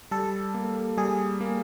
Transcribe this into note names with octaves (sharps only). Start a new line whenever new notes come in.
G3 A4
A#3
G3 G#4
A#3